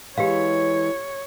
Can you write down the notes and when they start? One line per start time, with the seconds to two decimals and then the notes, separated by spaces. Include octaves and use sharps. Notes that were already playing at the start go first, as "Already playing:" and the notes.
0.18 E3 G#3 G4 C#5 F5